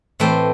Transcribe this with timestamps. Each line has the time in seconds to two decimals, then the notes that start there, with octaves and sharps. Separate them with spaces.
0.20 A2 E3 A3 C4 C5